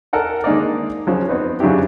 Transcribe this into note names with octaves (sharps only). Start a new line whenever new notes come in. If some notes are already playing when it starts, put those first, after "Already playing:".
A4 A#4 F#5 G#5
D#3 G#3 A#3 D4 D#4 D5
C#3 F3 F#3
B3 C4 D#4 B4
C#3 F#3 D4 E4 G4